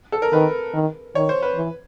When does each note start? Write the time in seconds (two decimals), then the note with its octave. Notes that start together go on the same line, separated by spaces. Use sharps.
0.12 A4
0.22 A#4
0.33 D#3 B4
0.74 D#3
1.15 D#3 C#5
1.29 C5
1.43 B4
1.56 E3